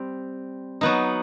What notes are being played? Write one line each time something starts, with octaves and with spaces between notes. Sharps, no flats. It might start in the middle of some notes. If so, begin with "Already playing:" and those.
Already playing: G3 C4
F#3 B3 D#4